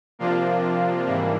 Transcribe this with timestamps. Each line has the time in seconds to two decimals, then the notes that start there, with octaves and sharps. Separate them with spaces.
0.19 C3 F3 A#3 D4 F4
1.06 G#2 E3 G3 A#3 D4